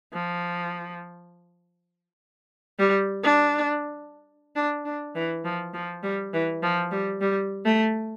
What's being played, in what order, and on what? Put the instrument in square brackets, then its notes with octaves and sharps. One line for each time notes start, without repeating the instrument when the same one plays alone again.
[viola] F3
G3
D4
D4
D4
E3
F3
F3
G3
E3
F3
G3
G3
A3